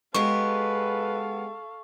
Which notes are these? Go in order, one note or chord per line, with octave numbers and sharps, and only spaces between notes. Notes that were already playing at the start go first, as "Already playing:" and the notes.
G#3 B3 G4 A4 B4 F5 C#6